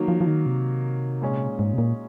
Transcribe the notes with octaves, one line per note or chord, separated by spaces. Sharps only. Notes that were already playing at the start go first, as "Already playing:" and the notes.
Already playing: D#3 F#3 A#3
F3
F3
D#3
C3
A#2 G#3 C#4
G#2
C3
A#2